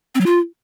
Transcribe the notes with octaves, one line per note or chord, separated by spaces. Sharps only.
C4
F#3
F4